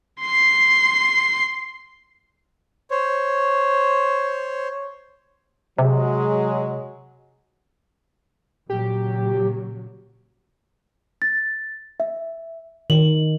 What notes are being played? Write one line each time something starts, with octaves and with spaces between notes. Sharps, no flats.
C6 C7
C5 C#5
C3 F#3 G#3
A#2 C#3 F#3 G4
A6
E5
D#3 F#7